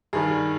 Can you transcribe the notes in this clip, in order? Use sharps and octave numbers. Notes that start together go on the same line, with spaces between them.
G2 D#3 G3 G#4